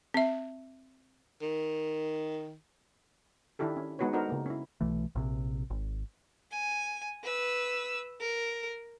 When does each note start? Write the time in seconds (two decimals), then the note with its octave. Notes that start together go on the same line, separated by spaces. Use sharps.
0.14 C4 E5
1.42 D#3
3.59 D#3 D4 E4 G4 A4
3.77 C#4
3.99 G#3 B3 D#4 F#4 B4 C#5
4.13 D4 D#4 F#4 A4 A#4 C5
4.29 C#3 A#3
4.46 C#4 E4
4.81 B1 E3 A3
5.15 A#1 C3
5.70 G#1
6.51 G#5
7.23 B4 E6
8.20 A#4